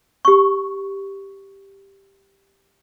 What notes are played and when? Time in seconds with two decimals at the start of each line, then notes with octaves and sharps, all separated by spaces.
0.25 G4 C#6